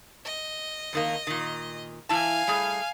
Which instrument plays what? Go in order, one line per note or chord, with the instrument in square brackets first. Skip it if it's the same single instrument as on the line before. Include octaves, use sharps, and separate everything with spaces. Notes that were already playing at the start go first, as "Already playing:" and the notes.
[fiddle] D#5
[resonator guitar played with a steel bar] F2 D#3 A#3
A#2 D#3
[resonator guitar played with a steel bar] E3 E4 A5 [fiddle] F5 G#5
[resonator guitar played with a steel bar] G3 A3 G#4